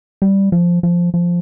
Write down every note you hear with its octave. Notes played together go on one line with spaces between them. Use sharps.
G3
F3
F3
F3